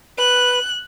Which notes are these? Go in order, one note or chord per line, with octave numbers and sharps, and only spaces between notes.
B4 F#6